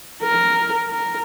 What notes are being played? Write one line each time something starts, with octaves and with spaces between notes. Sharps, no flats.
A#4
A#4